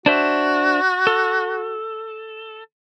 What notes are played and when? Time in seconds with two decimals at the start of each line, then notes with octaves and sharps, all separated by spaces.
0.06 D4 F#4 C5 E5
1.07 A4